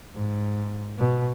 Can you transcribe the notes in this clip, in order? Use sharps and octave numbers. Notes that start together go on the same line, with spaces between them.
G#2
B2